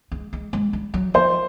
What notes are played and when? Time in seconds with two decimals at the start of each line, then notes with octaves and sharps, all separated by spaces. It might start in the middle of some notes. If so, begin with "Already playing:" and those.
0.12 G#3
0.33 G#3
0.53 G#3
0.73 G3
0.94 F#3
1.14 F3 C5